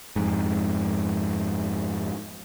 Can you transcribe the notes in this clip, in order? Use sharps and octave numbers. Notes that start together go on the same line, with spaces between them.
F2 G#2